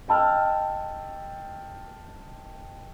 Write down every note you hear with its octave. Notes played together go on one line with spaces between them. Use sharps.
D#5 G5 A5 E6 F6